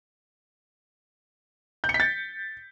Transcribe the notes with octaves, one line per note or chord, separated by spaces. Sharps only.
G6
C#7
B6
A6